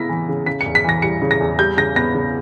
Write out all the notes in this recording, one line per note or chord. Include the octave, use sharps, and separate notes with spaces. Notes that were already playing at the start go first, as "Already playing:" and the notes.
Already playing: C#3 B3 E4 A#6 B6
E3
C#3
C#3 B6
C#7
E2
B6
E3 A#6
G3 C#7
C#3
A#6
E2
G3 G6
C#3 A#6
B3 A#6
C#3